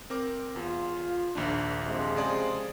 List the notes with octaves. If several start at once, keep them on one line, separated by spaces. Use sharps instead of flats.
C4 A#4 D6
E2 F4
A#1 D#2 D4
C3 F3 G#3
C#3 G#4 D5